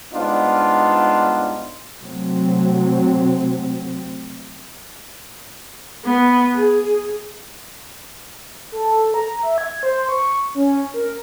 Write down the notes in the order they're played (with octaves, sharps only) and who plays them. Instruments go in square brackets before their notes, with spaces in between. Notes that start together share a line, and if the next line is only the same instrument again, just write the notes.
[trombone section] G#2 G3 B3 D4 D#4 F4
[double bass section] C3 F#3 A3 C4
[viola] B3
G#4
[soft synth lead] A4
A#5
E5
G#6
C5
C#6
C#4
A#4